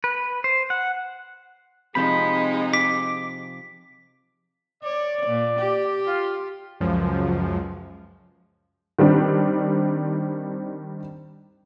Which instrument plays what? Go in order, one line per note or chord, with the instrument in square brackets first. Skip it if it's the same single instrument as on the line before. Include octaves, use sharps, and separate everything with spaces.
[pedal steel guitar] B4
C5
F#5
[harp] C3 F3 [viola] G#3 D#4 [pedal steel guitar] B5
[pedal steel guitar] D6 [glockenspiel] B6
[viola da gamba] C#5 [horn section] D5
[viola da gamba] A#2
G4
[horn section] F4
[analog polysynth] C#2 F#2 F3
[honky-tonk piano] D#3 G3 C4 D4